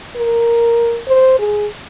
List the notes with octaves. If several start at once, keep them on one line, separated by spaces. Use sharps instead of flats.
A#4
C5
G#4